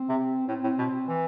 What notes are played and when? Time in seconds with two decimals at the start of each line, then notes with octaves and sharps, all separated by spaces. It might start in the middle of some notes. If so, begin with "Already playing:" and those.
Already playing: C4
0.09 C3
0.48 A2 C4
0.64 A2
0.78 B2
1.08 E3